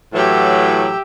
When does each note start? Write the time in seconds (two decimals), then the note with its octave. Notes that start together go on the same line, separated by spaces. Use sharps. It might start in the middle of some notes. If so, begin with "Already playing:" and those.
0.14 A2 E3 F#3 G4 E5